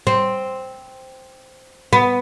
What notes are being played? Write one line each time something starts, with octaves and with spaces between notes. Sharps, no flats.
C4
B3